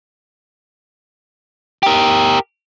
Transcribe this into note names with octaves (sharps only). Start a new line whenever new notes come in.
G4 A#4